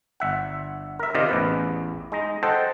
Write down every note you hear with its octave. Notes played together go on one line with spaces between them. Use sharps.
G1 E5 F#5
A#4 E5
C3 D#3 F4 D5 D#5 F5
A1 E2 B4
G#3 D#4 A#5
A4 C5 D#5 F#5 G5 A5